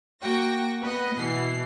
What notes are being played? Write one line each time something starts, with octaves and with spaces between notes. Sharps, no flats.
A#3 F#4 G5 C#6 A#6
B3 B4 D#5
B2 E3 C7